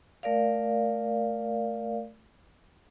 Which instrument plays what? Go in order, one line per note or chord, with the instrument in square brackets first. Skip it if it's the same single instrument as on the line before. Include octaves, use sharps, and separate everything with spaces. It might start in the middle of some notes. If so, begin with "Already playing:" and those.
[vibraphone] A3 A#4 D5 F5